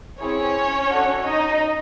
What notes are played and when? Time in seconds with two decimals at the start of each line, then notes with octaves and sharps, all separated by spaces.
0.20 C4 C#4 E4 G#4 C#5
0.88 D4 F#4 A4
1.22 D#4 D#5